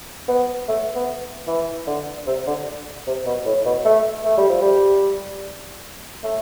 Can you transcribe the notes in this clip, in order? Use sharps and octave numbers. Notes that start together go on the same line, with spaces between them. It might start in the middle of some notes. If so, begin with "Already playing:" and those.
B3
A3
B3
E3
D3
C3
D3
C3
B2
A2
B2
A3
A3
G3
F3
G3
A3